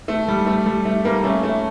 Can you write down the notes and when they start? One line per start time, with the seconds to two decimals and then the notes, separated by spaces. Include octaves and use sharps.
0.08 A3
0.28 G3
0.46 A3
0.66 G3
0.85 A3
1.05 G3 A#3
1.23 A3 C#4
1.43 A3